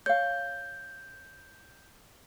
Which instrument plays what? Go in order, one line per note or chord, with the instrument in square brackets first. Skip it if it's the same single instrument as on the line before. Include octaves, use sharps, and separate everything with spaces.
[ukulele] C#5 F5 [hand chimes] G6